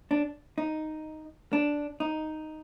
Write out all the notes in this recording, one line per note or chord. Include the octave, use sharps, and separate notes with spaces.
D4
D#4
D4
D#4